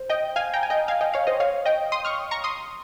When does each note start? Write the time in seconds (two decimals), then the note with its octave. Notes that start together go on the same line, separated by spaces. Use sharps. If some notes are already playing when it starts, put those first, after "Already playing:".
Already playing: C5
0.10 D#5 G5
0.36 F5 G#5
0.53 G5 A#5
0.63 G#5
0.70 D#5 G5
0.88 F5 G#5
1.01 D#5 G5
1.14 C#5 F5
1.27 C5 D#5
1.40 C#5 F5
1.65 D#5 G5
1.92 C6 D#6
2.05 C#6 F6
2.31 A#5 C#6
2.44 C6 D#6